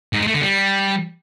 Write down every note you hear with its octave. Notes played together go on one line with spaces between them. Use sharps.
G#2
G#3
A3
D3
G3